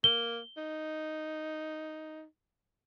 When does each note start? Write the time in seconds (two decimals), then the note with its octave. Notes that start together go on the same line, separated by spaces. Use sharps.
0.04 A#3 G7
0.57 D#4